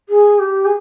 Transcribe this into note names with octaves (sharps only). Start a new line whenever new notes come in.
G#4
G4
G#4